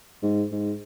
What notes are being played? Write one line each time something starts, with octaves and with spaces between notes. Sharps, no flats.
G#2
G#2